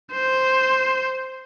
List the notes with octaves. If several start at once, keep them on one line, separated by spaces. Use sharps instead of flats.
C5